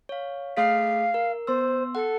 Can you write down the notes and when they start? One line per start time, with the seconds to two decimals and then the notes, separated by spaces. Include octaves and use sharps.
0.09 C#5 F5
0.57 A3 G#4 F5 B6
1.14 A#4
1.47 B3 C5 C6 E6
1.95 A4 F#5